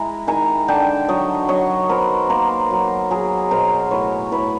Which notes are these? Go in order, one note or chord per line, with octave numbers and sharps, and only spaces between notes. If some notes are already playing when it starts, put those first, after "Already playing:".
Already playing: G#3 E4 G#5 A#5
D#3 G#5 A#5
D3 G5 A5
F#3 C#5 D#5
F#3 C#5 D#5
B3 A#4 C5
A#3 A#4 C5
F#3
F#3 G#4 A#4
B2 A#4 C5
A2 B4 C#5
A2 B4 C#5